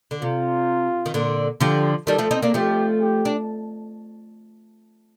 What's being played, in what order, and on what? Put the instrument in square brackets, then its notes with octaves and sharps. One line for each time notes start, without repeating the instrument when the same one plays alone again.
[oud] D3
[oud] C3 [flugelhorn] F4
[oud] D#3
A#2 D3
[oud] D3 F3 [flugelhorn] G4
[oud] D#3 G3 [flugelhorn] A4
[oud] F3 A3
C4 D#4
A#3 D4
[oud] F3 A3 [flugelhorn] G4
[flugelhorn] G4
[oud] D4